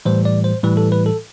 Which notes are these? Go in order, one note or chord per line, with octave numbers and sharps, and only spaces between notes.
A2 E3 G3 C5
D5
C5
A2 E3 G3 B4
A4
B4
A4